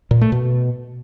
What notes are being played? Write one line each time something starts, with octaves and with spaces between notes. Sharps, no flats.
A#2
A3
B2